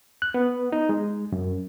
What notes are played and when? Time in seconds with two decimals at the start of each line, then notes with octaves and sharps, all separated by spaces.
0.22 F#6
0.34 B3
0.72 D#4
0.89 G#3
1.32 F#2